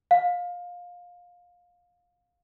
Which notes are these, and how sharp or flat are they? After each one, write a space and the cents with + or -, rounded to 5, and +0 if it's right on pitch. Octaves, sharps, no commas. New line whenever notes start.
F5 +20